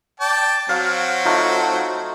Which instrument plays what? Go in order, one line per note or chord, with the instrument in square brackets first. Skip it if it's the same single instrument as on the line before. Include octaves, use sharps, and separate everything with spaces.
[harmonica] D5 G5 A5
[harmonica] F#3 C4 F#4 [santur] F5
[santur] A3 D#4 F4